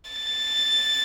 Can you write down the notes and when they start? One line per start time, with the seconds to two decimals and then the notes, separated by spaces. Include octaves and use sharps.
0.11 A6